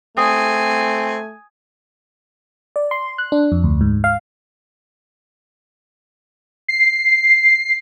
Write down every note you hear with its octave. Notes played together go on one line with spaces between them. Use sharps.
A3 C4 G#5 D#6
D5
C6
F#6
D4
F2
D2
G#2
F5
C7